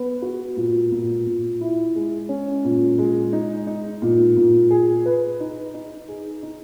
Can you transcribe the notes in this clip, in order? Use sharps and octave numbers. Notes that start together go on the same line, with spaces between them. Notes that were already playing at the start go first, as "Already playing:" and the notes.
Already playing: B3
F#4
A#2
A#2
A#2
E4
G#3
C#4
A#2
G#3
D#4
D#4
A#2
A#2
G#4
B4
D#4
D#4
G#4
D#4